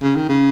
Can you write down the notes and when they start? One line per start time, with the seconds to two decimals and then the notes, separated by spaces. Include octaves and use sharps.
0.02 C#3
0.16 D#3
0.29 C#3